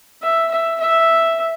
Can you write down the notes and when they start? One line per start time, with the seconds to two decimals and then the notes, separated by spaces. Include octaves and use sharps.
0.23 E5
0.51 E5
0.80 E5